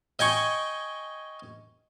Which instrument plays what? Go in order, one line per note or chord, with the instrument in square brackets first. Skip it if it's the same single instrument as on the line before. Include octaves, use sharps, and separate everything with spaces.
[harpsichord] D#5 G5 G#5 C#6